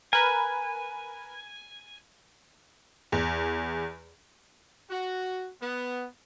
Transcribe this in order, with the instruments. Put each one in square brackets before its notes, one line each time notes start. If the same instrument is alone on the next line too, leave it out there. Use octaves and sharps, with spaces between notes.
[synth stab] A#4 B4 [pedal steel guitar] G#5
[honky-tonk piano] E2
[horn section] F#4
B3